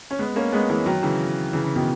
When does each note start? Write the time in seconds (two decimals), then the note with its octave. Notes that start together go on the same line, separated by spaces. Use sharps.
0.11 C#4
0.19 G#3 B3
0.36 A#3 C#4
0.52 G#3 B3
0.70 E3 G#3
0.86 D#3 F#3
1.03 C#3 E3
1.53 C#3 E3
1.64 C#3
1.75 B2 D#3